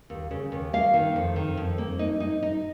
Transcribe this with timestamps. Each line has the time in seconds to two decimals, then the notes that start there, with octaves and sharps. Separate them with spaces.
0.10 D#2
0.31 C#3
0.52 D#2
0.73 A#3 F5
0.94 D#3
1.16 F2
1.36 D#3
1.57 F2
1.78 A#3
1.99 D#4
2.20 D#4
2.43 D#4